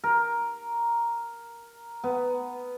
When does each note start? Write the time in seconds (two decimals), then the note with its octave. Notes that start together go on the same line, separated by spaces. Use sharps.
0.04 A#4
2.04 B3